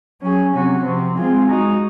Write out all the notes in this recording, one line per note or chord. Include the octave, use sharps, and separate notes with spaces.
F#3 C#4 G#4
C3 F#3 C#4 F#4
C3 F3 C4
G#3 C4 F4 G#4
G#3 D#4 F#4